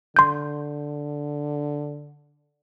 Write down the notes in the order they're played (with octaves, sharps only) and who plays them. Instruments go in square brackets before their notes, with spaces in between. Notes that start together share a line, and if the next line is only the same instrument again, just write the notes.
[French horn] D3 [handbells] C6 G6